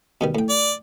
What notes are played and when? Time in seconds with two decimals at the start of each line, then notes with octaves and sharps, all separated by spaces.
0.21 B2 D#3 G3
0.35 A2 G5
0.50 D5